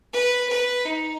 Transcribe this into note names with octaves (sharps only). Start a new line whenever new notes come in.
B4
B4
D#4